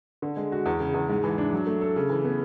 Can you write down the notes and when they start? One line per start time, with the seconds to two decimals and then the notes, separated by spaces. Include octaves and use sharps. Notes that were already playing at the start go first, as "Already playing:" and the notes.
0.22 D3
0.37 G#3
0.52 F#4
0.66 E2
0.80 C#3
0.94 E2
1.09 G#2
1.24 E3
1.38 D4
1.53 F#3
1.66 A3
1.81 A4
1.96 C#3
2.10 E3
2.24 B3